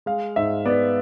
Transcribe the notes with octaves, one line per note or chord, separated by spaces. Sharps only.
G#3 F5
G#2 E5
B3 D5